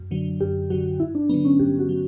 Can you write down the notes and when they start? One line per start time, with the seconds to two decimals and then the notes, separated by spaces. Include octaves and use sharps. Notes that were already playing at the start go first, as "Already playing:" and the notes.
Already playing: F#2
0.11 D3 F#3
0.41 F#2 G4
0.70 D3 F#3 F#4
1.00 G2 E4
1.15 D4
1.29 D3 F#3 B3
1.45 C#4
1.59 G2 G4
1.79 F#4
1.89 F#3